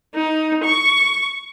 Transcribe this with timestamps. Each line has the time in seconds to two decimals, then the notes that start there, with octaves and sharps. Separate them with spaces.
0.15 D#4
0.64 C#6